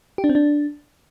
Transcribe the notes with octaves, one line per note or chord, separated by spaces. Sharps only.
G4
D4
C4
D4